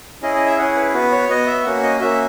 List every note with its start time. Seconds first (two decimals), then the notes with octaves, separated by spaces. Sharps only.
0.22 C#4 E4 G#4 D#5
0.35 D#5
0.46 E5
0.59 C#4 E4 G#4 F#5
0.76 B4
0.94 B3 F#4 B4
1.12 C#5
1.29 B3 F#4 D#5
1.47 E5
1.64 A#3 C#4 F#4 F#5
1.83 D#5
2.00 A#3 C#4 F#4 E5